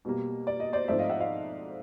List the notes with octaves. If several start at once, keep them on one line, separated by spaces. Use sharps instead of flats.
B2 G3 A#3
D5
D#5
C5 D5
G#2 F3 A3 C4 D5 E5
D#5 F5
E5 F#5
D#5 F5